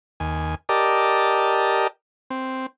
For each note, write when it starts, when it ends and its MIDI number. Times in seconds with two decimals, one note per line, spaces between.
0.20 0.55 39
0.20 0.55 80
0.69 1.87 67
0.69 1.87 70
0.69 1.87 74
0.69 1.87 75
0.69 1.87 81
2.30 2.66 60